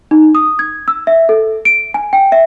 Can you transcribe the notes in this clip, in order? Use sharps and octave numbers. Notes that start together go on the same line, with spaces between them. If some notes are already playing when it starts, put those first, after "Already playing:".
D#4
D#6
G#6
E6
E5
A4
D7
G#5
G5
E5